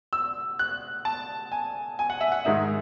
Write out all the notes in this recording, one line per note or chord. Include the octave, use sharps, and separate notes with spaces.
E6
F#6
A5
G#5
G#5
F#5
E5
F#5
G#2 D#3 G#3 D#4 E5